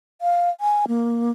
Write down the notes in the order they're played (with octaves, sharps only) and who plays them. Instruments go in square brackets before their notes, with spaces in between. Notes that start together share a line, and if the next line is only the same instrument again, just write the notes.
[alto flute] F5
G#5
A#3